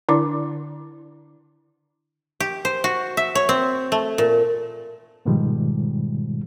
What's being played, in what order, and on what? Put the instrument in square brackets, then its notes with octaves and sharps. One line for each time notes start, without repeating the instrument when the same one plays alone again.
[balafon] D3 D4 E4 D5 D6
[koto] G4
C5
F#4
E5
C#5
C4
A3
A#2
[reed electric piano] G#2 B2 D#3 F3 G3 G#3